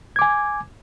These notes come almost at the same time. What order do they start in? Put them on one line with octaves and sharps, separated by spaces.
G#6 D6 G#5